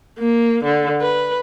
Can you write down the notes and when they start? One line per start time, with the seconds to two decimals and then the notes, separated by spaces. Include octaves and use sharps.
0.19 A#3
0.64 D3
1.01 B4